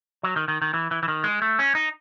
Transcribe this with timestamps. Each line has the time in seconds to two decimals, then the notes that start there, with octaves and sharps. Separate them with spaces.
0.23 F#3
0.36 D#3
0.48 D#3
0.62 D#3
0.74 E3
0.91 E3
1.03 E3
1.08 D#3
1.24 G#3
1.42 A3
1.59 C#4
1.75 D#4